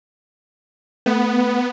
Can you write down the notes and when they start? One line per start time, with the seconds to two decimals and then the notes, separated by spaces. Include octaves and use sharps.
1.06 A3 B3